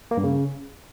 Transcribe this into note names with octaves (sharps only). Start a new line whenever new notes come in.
A#3
G2
C#3